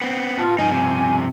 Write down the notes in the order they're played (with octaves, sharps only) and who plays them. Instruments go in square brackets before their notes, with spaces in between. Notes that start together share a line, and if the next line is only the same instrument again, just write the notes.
[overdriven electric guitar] B3 C4
[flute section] F4 [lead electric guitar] B4 A5
[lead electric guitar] G2 F3 [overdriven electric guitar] D#3 D#4 [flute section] G#5
[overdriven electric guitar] C3